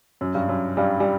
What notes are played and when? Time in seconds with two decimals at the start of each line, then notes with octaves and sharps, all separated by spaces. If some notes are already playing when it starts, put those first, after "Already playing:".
0.21 F#2
0.35 G2
0.49 F#2
0.77 G2 G3
1.00 G3